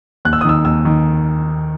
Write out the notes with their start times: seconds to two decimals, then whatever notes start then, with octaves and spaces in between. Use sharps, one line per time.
0.25 D#2 F#6
0.33 E6
0.41 D#6
0.45 D#3 E6
0.65 D#2 E6
0.85 D#3